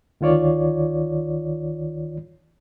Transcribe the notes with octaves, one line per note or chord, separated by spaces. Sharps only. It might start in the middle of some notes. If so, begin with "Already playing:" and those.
D2 D#3 F4 C#5 D5